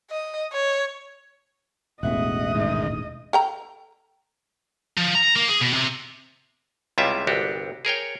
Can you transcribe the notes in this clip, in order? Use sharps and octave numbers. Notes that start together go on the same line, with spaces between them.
D#5
C#5
E1 A1 E2 D#5 E5 F#5
G#2 D#3
A4 G5 A#5
F3
A#5
A#3
G#4
B2
C3
C#2 C3 G3 E4 F4 E5
G1 C2 D4 F#4 G4
G#4 A#4 C#5 G5